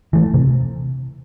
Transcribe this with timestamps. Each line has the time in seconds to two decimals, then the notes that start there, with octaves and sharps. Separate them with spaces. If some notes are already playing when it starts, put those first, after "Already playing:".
0.13 E3 A3
0.34 C3